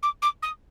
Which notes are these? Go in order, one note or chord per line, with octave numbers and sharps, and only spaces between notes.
D6
D6
D#6